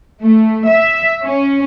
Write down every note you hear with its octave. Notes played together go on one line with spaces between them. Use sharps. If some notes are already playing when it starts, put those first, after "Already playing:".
A3
E5
C#4